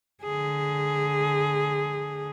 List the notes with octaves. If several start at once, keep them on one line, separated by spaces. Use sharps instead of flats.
D3 G#4